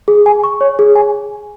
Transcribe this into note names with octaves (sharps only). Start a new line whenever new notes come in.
G#4
G#5
C#6
C#5
G#4
G#5